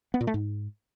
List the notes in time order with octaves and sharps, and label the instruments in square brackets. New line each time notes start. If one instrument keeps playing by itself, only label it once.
[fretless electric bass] B3
A#2
A3
G#2